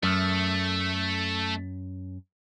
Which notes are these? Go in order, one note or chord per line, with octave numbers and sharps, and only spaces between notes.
F#2 A3